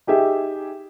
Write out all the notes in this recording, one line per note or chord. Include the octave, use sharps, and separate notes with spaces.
D#4 G4 G#4 E5